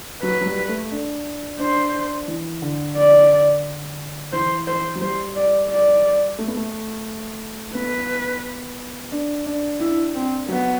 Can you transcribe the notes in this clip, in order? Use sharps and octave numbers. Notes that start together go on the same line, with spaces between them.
F#3 B4
F#3
G3
A3
D4
D4 C5
E3
D3
D5
E3 C5
C5
F#3
G3 C5
D5
D5
A3
B3
A3
B3 B4
D4
D4
D4 E4
C4
F#3 B3